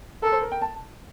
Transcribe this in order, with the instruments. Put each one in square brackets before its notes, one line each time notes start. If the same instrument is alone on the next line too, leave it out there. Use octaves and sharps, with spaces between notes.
[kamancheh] A4 [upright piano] A#4
[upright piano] C5
A#4
G5
A5